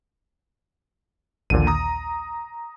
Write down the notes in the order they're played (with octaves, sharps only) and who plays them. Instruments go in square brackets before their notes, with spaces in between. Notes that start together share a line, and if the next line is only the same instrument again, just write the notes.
[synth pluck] A#1 D#2 [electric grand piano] A#2 D3 D#7
[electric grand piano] A#5 D#6